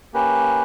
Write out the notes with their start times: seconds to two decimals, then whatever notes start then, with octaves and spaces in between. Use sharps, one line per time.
0.14 A#3 C#4 G4 B4